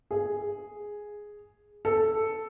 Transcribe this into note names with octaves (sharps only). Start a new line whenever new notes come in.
G#4
A4